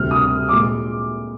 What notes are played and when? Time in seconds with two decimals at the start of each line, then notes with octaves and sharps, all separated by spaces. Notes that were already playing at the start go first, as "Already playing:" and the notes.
Already playing: D2 C3 G3 F6
0.11 D#6
0.49 A#2 G#3 D6